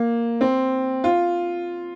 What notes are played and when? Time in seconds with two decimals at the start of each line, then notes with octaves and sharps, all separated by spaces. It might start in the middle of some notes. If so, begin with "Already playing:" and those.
Already playing: A#3
0.41 C4
1.04 F4